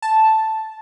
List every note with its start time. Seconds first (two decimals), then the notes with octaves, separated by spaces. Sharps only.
0.02 A5